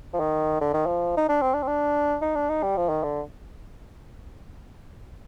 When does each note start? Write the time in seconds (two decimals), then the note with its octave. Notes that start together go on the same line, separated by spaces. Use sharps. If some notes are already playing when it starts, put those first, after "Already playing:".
0.14 F3
0.20 D#3
0.61 D3
0.74 D#3
0.87 F3
1.17 D#4
1.29 D4
1.42 C4
1.54 D4
1.63 C4
1.68 D4
2.22 D#4
2.36 D4
2.50 D#4
2.63 G3
2.77 F3
2.90 D#3
3.03 D3